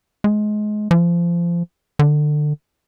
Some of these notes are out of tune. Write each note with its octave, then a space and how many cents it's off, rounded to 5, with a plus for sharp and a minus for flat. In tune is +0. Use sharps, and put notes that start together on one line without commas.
G#3 +25
F3 -25
D3 +25